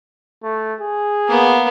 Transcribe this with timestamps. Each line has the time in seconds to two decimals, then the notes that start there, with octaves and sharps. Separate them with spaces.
0.43 A3
0.81 G#4
1.28 A#3 B3